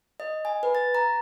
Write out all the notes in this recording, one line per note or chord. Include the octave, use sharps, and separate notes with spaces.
D#5
G#5
B4
A6
A#5